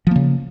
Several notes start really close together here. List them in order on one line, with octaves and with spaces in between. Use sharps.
F3 A#3 C#3